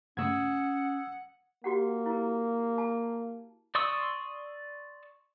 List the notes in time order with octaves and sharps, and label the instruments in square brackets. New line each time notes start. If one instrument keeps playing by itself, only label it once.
[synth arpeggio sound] G2 C#3 A3 [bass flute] C#4 [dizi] F#5 [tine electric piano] D#6 E6 G#6
[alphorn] A#3 [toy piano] F#4 G4 F#5
[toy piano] E4 A#4
A5
[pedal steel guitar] D5 C6 C#6 D#6 E6